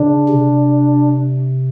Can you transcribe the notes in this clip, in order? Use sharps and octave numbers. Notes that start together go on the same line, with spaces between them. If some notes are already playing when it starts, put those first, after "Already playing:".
Already playing: C#3 D4
C3